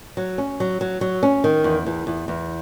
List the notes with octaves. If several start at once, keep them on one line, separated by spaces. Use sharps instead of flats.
F#3
C#4
F#3
F#3
F#3
C#4
D#3
E2
E2
E2
E2